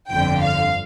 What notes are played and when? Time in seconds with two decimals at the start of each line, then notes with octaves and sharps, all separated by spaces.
0.11 G1 F2 D3 G5
0.41 F5